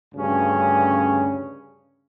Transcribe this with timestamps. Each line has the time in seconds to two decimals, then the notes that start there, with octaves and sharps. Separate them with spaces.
0.14 D2 G2 C#3 C#4